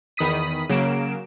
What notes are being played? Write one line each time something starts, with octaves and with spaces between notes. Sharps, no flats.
E2 D#3 B5 D#6 B6 D#7
C#3 F#3 A#3 D7 E7